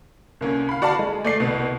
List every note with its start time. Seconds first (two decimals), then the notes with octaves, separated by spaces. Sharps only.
0.41 C2 A#3 C#4
0.69 F5 B5
0.82 F#4 D5 F5 A5 B5
0.99 G#3
1.24 A3 D5 C7
1.40 C2 B2 B3